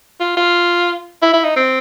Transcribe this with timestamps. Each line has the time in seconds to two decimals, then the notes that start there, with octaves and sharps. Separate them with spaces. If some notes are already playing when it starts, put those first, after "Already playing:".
0.20 F4
0.37 F4
1.23 E4
1.33 E4
1.44 D#4
1.56 C4